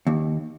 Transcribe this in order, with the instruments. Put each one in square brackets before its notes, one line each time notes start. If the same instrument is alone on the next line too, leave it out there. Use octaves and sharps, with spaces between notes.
[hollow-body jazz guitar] D#2